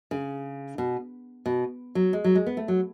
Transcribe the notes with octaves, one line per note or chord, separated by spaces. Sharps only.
C#3
B2
B2
F#3
G#3
F#3
G#3
B3
A3
F#3